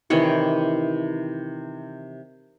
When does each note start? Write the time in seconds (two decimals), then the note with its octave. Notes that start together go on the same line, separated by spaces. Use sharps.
0.10 C3 D#3 E3 C#5